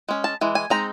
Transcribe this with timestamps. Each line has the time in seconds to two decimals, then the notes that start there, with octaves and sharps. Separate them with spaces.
0.09 G#3 C#4
0.24 A5
0.41 E3 G#3
0.55 G#5
0.70 G#3 C4 D#4 A#5